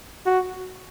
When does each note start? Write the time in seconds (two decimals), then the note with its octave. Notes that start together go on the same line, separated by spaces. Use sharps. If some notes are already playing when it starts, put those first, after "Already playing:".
0.26 F#4